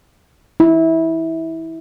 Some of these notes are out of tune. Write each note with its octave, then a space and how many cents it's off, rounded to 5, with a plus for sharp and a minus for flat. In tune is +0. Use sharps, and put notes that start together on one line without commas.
E4 -20